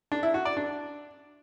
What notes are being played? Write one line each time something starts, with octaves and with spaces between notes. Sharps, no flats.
D4
E4
F#4
D5
D4